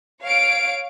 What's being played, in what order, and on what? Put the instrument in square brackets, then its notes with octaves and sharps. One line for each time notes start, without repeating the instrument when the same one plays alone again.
[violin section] C#5 F5 D7